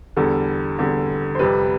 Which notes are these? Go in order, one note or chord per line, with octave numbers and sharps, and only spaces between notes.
E2 D3 G3 A4
E2 D3 G3
C5
F2 C3 G3 B4